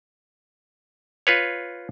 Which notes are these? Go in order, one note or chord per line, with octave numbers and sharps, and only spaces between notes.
F4 B4 C#5